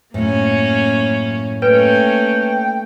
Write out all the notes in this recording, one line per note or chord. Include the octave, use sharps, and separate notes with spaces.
F#2 A2 A#3 C#4
A3 A#3 C#4 B4 G5